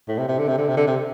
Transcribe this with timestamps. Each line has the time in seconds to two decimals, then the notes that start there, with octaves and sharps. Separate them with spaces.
0.08 A2
0.19 C3
0.29 C3
0.39 D3
0.48 C3
0.58 D3
0.68 C3
0.77 D3
0.87 C3